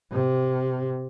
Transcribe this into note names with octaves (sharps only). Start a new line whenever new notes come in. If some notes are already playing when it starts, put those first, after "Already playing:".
C3